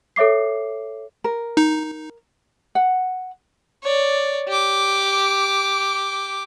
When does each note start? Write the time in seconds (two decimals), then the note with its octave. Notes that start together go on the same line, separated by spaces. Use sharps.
0.16 A4 C#5 E5 D6 C7
1.24 A#4
1.57 D#4
2.75 F#5
3.83 C#5 D5
4.48 G4 D6